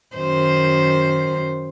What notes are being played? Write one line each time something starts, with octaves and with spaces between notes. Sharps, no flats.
F#2 D#3 C5